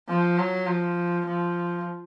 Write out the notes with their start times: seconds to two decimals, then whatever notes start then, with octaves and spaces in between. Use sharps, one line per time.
0.09 F3
0.38 F#3
0.67 F3
1.26 F3